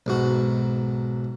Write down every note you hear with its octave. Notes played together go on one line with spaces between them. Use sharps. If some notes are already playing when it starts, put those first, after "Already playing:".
B1 G#2 F#4